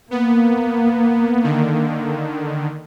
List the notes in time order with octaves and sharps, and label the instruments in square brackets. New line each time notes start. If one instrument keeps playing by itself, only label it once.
[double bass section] A#3 [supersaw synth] B3
[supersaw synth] D3 D#3